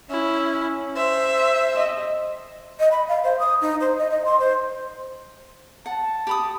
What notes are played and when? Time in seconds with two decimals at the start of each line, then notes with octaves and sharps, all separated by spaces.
0.10 C#4 E4
0.97 C5 E5
1.75 D#5
2.80 D#5
2.91 B5
3.09 F5
3.24 C5
3.40 D#6
3.61 D#4
3.81 C5
3.98 D#5
4.11 D#5
4.25 C6
4.39 C5
5.86 F#5 A5
6.27 G4 B5 D#6